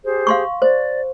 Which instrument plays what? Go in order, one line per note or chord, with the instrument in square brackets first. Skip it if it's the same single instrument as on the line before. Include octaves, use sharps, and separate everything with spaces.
[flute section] G4 G#4 C5
[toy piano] F5 C6 C#6
[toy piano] C5 [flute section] D5